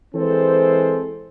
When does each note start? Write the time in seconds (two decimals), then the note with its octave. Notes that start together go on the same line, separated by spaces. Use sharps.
0.15 E3 G#3 C4 A4 C5